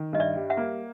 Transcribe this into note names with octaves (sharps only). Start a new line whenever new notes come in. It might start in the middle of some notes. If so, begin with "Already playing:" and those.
Already playing: D#3
G2 D#5
D5 E5
G3
E5 F#5
A#3